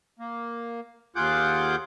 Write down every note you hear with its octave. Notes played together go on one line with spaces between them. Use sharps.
A#3
D#2 F4 G#4 F#5 D6 G6